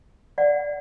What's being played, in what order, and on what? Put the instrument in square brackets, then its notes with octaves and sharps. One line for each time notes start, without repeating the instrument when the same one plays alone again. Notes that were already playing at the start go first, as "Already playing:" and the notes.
[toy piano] D5 F#5